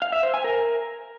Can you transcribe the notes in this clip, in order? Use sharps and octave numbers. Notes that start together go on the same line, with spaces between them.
F5
E5
C5
G#5
A#4